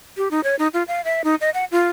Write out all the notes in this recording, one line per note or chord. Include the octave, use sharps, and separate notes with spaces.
G4
D#4
C#5
D#4
F4
F5
E5
D#4
D#5
F#5
F4